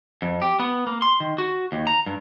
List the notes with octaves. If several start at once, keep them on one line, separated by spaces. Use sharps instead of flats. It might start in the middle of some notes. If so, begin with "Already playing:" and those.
F2
G4
B3
A#3
C6
D#3
F#4
D#2
A#5
G2